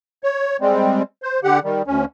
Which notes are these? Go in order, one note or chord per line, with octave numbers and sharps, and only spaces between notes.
C#5
G3 G#3 C4
C5
D3 G4 F#5
D#3 G3
D2 C#4